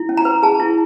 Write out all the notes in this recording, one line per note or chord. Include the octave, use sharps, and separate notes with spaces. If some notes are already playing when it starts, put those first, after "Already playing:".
Already playing: E4
C#4
A#5
B4
G#4 A5
E4